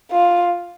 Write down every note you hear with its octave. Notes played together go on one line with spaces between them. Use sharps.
F4